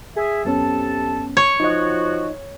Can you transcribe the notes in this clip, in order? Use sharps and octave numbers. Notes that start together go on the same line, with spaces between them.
G#4 E5
F#2 C3 B3 C#4 A4 A5
C#5
F3 D#4 F#4 D#5